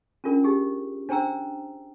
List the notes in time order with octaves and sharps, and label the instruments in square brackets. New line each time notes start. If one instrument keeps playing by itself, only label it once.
[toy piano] C#4 D4 F4 A#4
D#4 G4 G#4
D4 C5 G5 A#5 E6